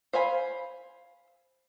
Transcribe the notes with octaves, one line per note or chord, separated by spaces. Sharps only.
C5 F5 G#5 B5